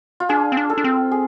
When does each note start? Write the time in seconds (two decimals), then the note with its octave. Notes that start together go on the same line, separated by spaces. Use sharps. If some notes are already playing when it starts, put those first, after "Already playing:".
0.20 F4
0.29 D4 G#4
0.52 C4
0.57 D4
0.70 A4
0.78 D4
0.84 C4
1.12 G#4